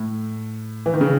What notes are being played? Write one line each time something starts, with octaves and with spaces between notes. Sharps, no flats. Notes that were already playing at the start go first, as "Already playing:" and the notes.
Already playing: A2
E3
D#3
C#3